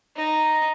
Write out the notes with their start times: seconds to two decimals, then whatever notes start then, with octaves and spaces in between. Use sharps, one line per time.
0.16 D#4